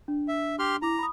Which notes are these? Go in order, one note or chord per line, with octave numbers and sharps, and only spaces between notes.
D4
E5
G4 C6 F6
E4 A#5 D6
B5 D#6